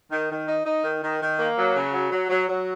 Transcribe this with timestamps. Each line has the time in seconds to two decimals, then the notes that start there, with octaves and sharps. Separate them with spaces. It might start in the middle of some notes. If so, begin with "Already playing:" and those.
0.11 D#3
0.29 D#3
0.47 D#4
0.65 D#4
0.83 D#3
1.02 D#3
1.20 D#3
1.39 A#3
1.57 F#3
1.75 C#3
1.94 F#3
2.11 F#3
2.29 F#3
2.48 F#3